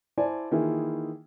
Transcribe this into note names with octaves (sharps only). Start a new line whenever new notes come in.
E4 C5 D5 G#5 A5
D#3 E3 A#3 E4 F4 G#4